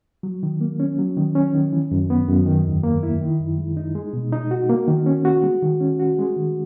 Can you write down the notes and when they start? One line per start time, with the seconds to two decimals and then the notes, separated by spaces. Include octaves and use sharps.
0.23 F#3
0.43 D#3
0.61 A#3
0.80 C#4
0.98 F#3
1.17 D#3
1.35 C#4
1.54 D#3
1.73 E3
1.91 F#2
2.10 B3
2.28 F#2
2.46 D#3
2.66 E2
2.84 A#3
3.03 E4
3.21 D#3
3.40 F#2
3.58 G#3
3.77 D#4
3.95 G#3
4.13 B2
4.33 D#4
4.51 F#4
4.70 A#3
4.88 D#3
5.06 C#4
5.25 F#4
5.43 G#3
5.62 D#3
5.80 C#4
5.99 F#4
6.19 G#3
6.36 D#3